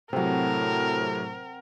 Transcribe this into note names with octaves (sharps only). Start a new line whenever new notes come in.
A2 C3 F#3 C4 A#4 F#5